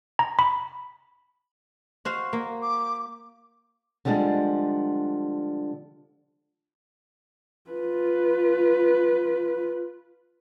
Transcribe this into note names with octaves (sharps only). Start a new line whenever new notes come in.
A#5
B5
F#4 C5 F5
A#3
D6
D3 F3 G3 G#3 D4
F4 B4